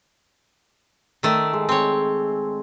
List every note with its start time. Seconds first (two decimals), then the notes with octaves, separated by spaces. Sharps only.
1.23 D#3 A3 D5
1.53 G#3
1.69 C4 C#5